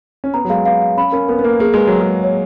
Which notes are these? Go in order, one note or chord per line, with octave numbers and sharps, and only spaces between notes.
C#4
B3 A#5
F#3
G#3 F5
B3 F5
F5
C#4 B5
C#4 A#4
B3 A#4
B3
A#3 A#4
A#3 G#4
G#3 B4
F#3 A#5
G#3
G#4
C#5